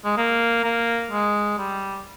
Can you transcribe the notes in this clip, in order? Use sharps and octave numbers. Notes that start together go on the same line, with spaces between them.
G#3
A#3
A#3
G#3
G3